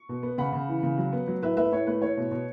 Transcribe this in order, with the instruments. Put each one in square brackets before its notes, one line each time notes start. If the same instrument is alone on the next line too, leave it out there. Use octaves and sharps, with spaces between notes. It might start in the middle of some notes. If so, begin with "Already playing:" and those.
Already playing: [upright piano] C#6
B2
B3
C#3 F#5 B5
C#3
E3
C#3
F#3
B3
F#3
A2 B4 E5
A3 B4 E5
A2 C#5
A3 B4
A2 C#5
B2
B2